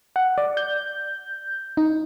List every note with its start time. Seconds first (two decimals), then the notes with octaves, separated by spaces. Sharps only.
0.16 F#5
0.38 D5
0.57 G6
1.77 D#4